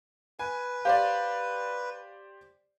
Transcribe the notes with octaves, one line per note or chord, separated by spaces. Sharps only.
B4 G#5
G4 C5 D5 F5